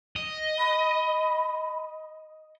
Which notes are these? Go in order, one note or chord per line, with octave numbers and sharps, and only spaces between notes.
D#5
B5